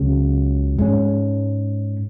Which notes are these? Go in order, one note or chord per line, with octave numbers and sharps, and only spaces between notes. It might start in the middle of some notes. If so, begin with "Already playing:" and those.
Already playing: C#2 C#3 F#3 C#4
G#2 G#3 C#4